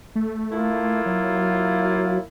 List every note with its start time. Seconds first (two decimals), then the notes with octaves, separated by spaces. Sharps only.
0.15 A3
0.51 A#3 E4 F4
1.06 F#3